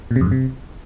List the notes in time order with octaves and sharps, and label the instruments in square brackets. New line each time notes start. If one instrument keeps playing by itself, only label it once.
[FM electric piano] A#2
C3
F2
G2
C3